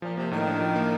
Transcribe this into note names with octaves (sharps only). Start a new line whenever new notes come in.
A#2 F3
C3 A#3
A2 D#3
D4
F3
A#3